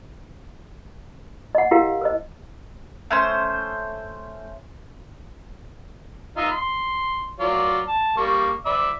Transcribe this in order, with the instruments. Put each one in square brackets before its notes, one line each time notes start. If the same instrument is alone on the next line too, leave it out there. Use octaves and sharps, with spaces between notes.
[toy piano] D#5 F#5
E4 G4 A#4 F5 F#5
A#4 C5 D#5
[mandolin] A3 C#4 C5
[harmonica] D#4 F4 E5
C6
F#3 F4 D5
A5
G3 A#3 C#6
D5 E5 B5